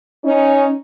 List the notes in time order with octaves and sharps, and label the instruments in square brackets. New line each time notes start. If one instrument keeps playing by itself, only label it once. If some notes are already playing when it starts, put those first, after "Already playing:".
[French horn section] C#4 D#4